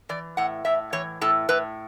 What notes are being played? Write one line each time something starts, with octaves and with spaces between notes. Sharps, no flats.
E3 D5
A2 F#5
A2 E5
E3 C#5
A2 A4
A2 B4